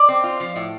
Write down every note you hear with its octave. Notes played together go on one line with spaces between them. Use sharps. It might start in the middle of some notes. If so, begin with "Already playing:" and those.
Already playing: D5
C4
F4
F3
A2